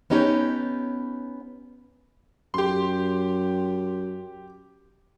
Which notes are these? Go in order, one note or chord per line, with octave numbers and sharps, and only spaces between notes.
B3 C#4 D#4 G4 C#5
F#2 G4 C6